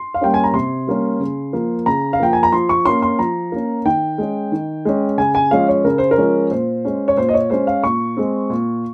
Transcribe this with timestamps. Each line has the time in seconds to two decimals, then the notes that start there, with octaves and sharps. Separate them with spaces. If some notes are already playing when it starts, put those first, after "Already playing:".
Already playing: C6
0.14 F5
0.21 G3 A#3 C#4 G5
0.34 G#5
0.44 A#5
0.54 C3 C6
0.87 G3 A#3 C#4
1.20 C#3
1.53 F3 A#3
1.86 C#3 A#5
2.13 F5
2.20 F3 A#3 G5
2.33 G#5
2.43 A#5
2.52 F3 C6
2.69 C#6
2.85 A#3 C#4 C6
3.02 C6
3.19 F3 A#5
3.52 A#3 C#4
3.85 D#3 G5
4.18 G#3 C#4
4.52 D#3
4.85 G#3 C#4
5.18 C#3 G#5
5.35 G#5
5.51 F3 G#3 C#4 F5
5.68 C#5
5.85 C#3 A#4
5.98 C5
6.11 A#4
6.18 F3 G#3 C#4
6.51 A#2 C5
6.85 G#3 C#4
7.08 C#5
7.17 A#2 C5
7.29 D#5
7.34 C#5
7.50 G#3 C#4 C5
7.67 F5
7.83 A#2 C#6
8.17 G#3 C4
8.50 A#2